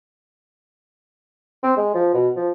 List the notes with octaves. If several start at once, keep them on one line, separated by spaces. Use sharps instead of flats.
C4
G#3
F3
B2
F3